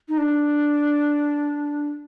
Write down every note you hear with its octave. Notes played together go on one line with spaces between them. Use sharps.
D#4
D4